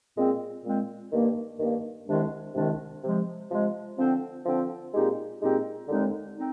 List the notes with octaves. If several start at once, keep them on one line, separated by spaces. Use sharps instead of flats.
A#2 G#3 C4
A#2 G#3 C4
G2 D#3 A#3
G2 D#3 A#3
C2 C3 D#3 G#3 D4
C2 C3 D#3 G#3 D4
C3 F3 G#3
C3 F3 G#3
D3 F3 C4
D3 F3 C4
A#2 G#3 C4 D#4 G4
A#2 G#3 C4 D#4 G4
D#2 D3 G#3 C4 D#4
C4 D#4